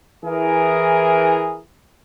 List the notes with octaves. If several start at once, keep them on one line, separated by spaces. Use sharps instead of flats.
E3 G#4 A#4